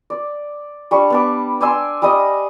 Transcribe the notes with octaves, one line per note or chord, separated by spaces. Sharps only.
D5
G3 D4 C#6
B3 A5 D6
D5 G#5 C6 E6
G3 D#5 D#6